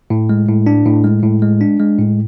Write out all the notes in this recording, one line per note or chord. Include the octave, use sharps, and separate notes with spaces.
A2
G#3
A2
D4
A2
G#3
A2
G#3
D4
G#3
A2